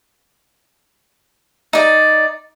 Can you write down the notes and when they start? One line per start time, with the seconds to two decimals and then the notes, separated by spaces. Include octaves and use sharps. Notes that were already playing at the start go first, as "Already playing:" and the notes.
1.73 D#4 D5